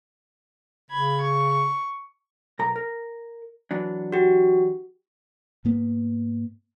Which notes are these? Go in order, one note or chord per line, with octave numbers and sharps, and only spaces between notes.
C#3 B5 G#6
C#6
B1 A#4 A#5
A#4
E3 F#3 D4
F#4 G4
G#2 A#3 B3